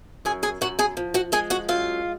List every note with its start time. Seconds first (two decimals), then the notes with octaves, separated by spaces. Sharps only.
0.25 F#2 G#4 G#5
0.43 G#4 G#5
0.61 F#2 F#4 F#5
0.79 G#4 G#5
0.97 F3
1.14 F#4 F#5
1.32 G#3 G#4 G#5
1.50 F#4 F#5
1.68 F#2 F4 F5